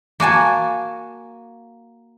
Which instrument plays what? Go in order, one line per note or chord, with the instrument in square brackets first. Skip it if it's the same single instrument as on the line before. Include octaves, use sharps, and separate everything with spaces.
[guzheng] A#3 F#4 G#5 A5